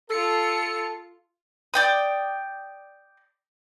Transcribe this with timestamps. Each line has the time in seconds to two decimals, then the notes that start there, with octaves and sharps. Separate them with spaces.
0.11 F4 A4 C#7
1.74 D5 G5 D#6